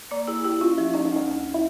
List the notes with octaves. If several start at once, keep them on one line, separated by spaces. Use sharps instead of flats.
A#3 D5
E4 G#4
E4 G4
C#4 F4
F3 E4
C#4 D#4
E4
D2 D#4
D2
E4